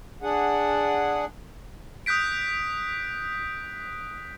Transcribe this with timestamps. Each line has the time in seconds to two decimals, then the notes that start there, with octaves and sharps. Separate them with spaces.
0.22 D4 G#4 F#5
2.06 D#6 F#6 G6 B6 D7